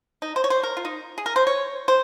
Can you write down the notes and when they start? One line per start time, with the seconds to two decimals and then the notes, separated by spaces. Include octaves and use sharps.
0.22 D#4
0.36 C5
0.44 C#5
0.50 C5
0.63 A#4
0.77 F4
0.85 D#4
1.18 G#4
1.26 A#4
1.36 C5
1.47 C#5
1.88 C5